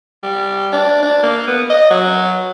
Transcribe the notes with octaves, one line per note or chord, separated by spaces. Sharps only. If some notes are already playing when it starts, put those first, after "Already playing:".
G3
D4
D4
A#3
B3
D#5
F#3